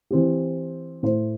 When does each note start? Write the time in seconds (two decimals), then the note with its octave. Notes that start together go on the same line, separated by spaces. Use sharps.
0.11 E3 C4 G4
1.03 A2 A3 E4 C5